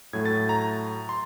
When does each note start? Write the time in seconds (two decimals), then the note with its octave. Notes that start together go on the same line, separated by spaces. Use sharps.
0.13 A2 F#3 A3 G#6
0.26 A6
0.49 A#5
1.09 C6